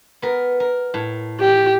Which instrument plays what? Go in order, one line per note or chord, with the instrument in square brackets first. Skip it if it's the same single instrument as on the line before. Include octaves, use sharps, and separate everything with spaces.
[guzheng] B3 A#4
A#4
A2
[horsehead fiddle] G4